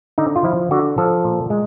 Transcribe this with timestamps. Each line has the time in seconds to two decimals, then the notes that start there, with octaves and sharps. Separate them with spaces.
0.18 D3 D#4
0.36 F4
0.44 F3 E4
0.71 D3 F#4
0.98 F3 A4
1.24 A#2
1.50 G#3